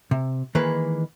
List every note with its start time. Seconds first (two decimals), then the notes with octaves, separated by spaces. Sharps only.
0.11 C3
0.55 D#3 E3 G#3 A#3 B4